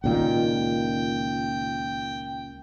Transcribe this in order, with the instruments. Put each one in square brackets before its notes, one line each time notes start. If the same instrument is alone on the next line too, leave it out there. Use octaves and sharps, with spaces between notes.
[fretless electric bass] C#2 A#2 D#3 [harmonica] G5